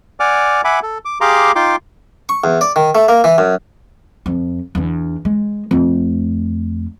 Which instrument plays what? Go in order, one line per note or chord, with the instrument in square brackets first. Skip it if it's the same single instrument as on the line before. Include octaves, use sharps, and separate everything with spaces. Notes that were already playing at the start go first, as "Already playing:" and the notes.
[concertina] D5 F#5 G#5 D6 F6
E5 F#5 G#5 B5 D6
A4
D6
G4 G#4 F5 A#5 C6 D6
D#4 F4 G5 C6 D6
[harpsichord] C#6
E2
D5
D#3
A3
A#3
E3
F#2
[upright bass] F2
E2 D4
G#3
F2 A3